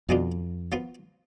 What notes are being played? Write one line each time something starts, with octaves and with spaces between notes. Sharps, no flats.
F2 B2 G#3 B3 D4 F4
F3 B3 F4